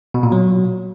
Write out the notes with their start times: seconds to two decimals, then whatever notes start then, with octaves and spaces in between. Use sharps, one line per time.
0.14 B2
0.23 A#2
0.32 F#3